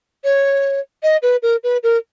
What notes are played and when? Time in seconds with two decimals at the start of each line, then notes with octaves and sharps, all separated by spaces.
0.24 C#5
1.03 D#5
1.23 B4
1.42 A#4
1.64 B4
1.83 A#4